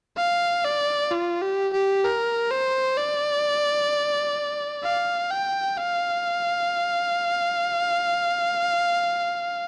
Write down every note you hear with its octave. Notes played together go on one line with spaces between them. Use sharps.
F5
D5
F4
G4
G4
A#4
C5
D5
F5
G5
F5